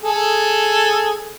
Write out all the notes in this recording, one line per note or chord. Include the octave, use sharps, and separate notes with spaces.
G#4 A4